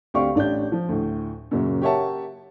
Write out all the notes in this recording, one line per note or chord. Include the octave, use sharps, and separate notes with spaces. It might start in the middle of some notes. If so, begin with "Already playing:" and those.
D2 C4 G4 D5 F5 C#6
A1 D4 G4 G6
F3
D2 A2
F#2 A#2 C#3 F#3
G4 A#4 C#5 E5 F#5 A5